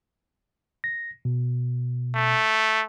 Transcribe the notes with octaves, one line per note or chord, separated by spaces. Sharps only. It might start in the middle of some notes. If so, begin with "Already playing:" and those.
A#6
B2
A3